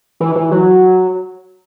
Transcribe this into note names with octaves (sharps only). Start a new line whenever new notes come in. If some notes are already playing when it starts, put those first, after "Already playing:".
E3
E3
F#3